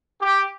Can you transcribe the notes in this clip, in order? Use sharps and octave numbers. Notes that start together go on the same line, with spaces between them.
G4